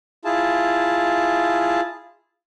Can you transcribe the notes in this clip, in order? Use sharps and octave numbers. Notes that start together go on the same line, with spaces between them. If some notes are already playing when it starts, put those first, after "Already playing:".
E4 F4 G#4 A5